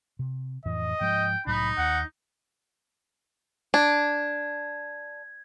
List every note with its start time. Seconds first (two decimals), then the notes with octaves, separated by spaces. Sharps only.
0.19 C3
0.65 F2 A2 E3 D#5
1.01 G#2 F3 G#3 G5
1.47 C2 A2 F#3 D#4 B5
1.78 D#2 F#5
3.74 D4 G#6